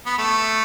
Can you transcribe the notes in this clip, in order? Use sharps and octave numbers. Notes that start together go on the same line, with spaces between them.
B3
A3